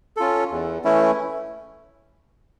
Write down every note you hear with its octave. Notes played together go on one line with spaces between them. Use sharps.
C#4 F4 A4
E2
E3 A3 C#4 E4